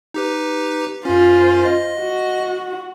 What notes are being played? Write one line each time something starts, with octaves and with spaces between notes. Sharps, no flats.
D#4 G4 B4
F#2 C#4 F4 C5
D#5
F#4